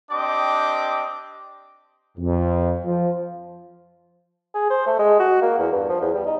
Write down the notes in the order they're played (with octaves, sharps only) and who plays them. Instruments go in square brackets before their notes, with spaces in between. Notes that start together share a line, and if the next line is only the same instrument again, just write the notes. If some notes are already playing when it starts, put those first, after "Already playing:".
[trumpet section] C4 D4 G4 D#5 D6
[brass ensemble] F2
F3
[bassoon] G#4
C5
A3
G#3
F#4
A#3
E2
G2
F3
E2
G3
D#4